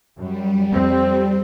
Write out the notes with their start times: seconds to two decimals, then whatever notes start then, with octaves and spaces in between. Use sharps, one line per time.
0.18 F#2 G3
0.73 F2 C4